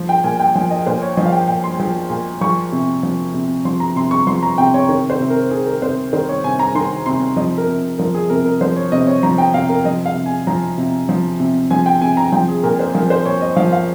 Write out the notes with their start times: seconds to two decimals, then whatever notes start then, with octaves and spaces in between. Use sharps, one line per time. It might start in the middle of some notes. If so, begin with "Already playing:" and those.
Already playing: F3
0.09 G5
0.24 A#2 G#5
0.40 G5
0.55 F3
0.70 D#5
0.86 A#2 C5
1.02 C#5
1.17 F3 D#5
1.26 F5
1.32 G5
1.48 A#2 G5
1.64 C6
1.80 F3
2.10 A#2
2.41 F3 C#6
2.72 C3
3.03 F3
3.34 C3
3.65 F3 C6
3.80 A#5
3.96 C3 C6
4.11 C#6
4.27 F3 C6
4.43 A#5
4.58 C3 G5
4.74 C#5
4.89 D#3 C#5
5.10 C5
5.20 C3
5.30 A#4
5.50 D#3 G#4
5.66 A#4
5.82 C3 C5
6.13 D#3 C5
6.29 C#5
6.44 C3 G#5
6.59 A#5
6.75 D#3 C6
7.06 C3 C6
7.36 F3 D#5
7.58 A#4
7.68 C3
7.98 F3 A#4
8.14 G#4
8.30 C3 A#4
8.45 A#4
8.61 F3 C5
8.76 C#5
8.92 C3 D#5
9.07 C#5
9.23 F3 A#5
9.38 G5
9.54 C3 F5
9.69 A#4
9.85 F3 D#5
10.06 F5
10.15 C3
10.26 G#5
10.47 F3 A#5
10.78 C3
11.09 F3
11.40 C3
11.70 F3 G#5
11.86 G5
12.01 C3 G#5
12.17 A#5
12.32 F3 G5
12.48 G#4
12.63 A#2 A#4
12.79 C5
12.94 F3 A#4
13.10 C5
13.26 A#2 C#5
13.42 D#5
13.56 F3 F5
13.73 F5